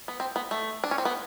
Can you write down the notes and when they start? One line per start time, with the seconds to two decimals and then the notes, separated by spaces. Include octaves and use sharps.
0.08 B3
0.20 C4
0.36 B3
0.51 A3
0.84 D4
0.91 C#4
0.98 C4
1.05 B3